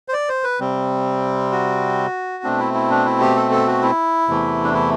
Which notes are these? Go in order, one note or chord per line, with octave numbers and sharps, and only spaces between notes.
C5
D5
C5
B4
C3 G3 C4
F#4
B2 A3 C4 D4
E4
E4
D4
E4
G4
A4
A4
F#4
E4
E2 C3 E3 A3
D4
E4